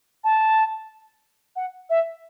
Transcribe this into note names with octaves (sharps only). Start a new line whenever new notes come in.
A5
F#5
E5